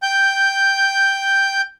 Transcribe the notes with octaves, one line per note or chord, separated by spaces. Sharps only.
G5 G6